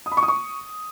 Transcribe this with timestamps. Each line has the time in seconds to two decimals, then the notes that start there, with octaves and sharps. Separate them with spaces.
0.06 D#6
0.12 B5
0.17 C#6
0.23 D#6
0.28 C#6